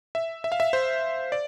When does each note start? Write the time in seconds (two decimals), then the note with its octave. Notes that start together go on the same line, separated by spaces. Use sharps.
0.15 E5
0.44 E5
0.52 F5
0.60 E5
0.73 C5
1.32 D5